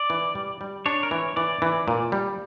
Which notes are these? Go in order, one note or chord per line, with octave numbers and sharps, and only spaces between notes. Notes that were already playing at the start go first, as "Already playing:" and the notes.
Already playing: D5
E3
G3
G3
D4 C#5
A#4
E3 C#5
E3 D5
E3
A#2
G3